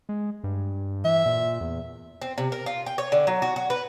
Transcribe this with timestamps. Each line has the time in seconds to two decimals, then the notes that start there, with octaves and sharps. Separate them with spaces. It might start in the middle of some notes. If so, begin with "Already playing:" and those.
0.09 G#3
0.44 G2
1.05 E3 E5
1.26 A#2
1.61 E2
2.21 C4
2.38 C3
2.52 A#4
2.66 F4
2.86 G5
2.98 C#5
3.12 D3
3.27 F#3
3.42 F#4
3.56 F#4
3.70 B4